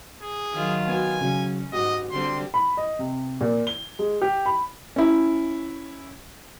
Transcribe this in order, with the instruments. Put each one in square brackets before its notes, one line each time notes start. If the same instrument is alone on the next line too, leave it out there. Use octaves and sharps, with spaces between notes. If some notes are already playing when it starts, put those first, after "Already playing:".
[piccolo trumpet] G#4
[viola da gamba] D#3 F#3 F4
[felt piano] B3 F#4 [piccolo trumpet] G#5
[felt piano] C#3 F#3 [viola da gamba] C#4
[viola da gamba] G#2 [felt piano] F#4 G4 [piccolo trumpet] D#5
[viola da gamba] D3 G3 C4 [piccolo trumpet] C6
[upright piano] B5
D#5
C3
A#2
G7
G#3
G4
B5
[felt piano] C#4 E4